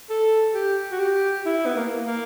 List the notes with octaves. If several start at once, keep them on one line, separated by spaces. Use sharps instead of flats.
A4
G4
F#4
G4
E4
B3
A#3
A#3